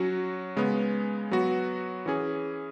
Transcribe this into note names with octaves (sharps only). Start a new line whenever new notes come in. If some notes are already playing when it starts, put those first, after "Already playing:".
Already playing: F#3 C#4 F#4
C#3 G#3 B3
F#3 B3 F#4
E3 C#4 G#4